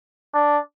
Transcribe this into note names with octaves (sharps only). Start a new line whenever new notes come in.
D4